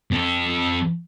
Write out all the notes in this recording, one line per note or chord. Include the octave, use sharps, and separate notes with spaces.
F2 A4